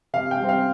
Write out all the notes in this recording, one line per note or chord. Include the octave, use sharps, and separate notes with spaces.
C3 F5
G5
G3 C4
F5